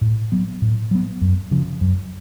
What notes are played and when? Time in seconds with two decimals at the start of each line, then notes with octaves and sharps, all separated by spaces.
0.01 A2
0.32 F#3 B3
0.62 A2
0.91 F#3 B3
1.21 F#2
1.51 C#3 F3
1.81 F#2